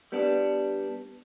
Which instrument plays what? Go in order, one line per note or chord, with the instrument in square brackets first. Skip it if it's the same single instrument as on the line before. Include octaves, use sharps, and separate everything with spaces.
[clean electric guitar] G3 B3 D4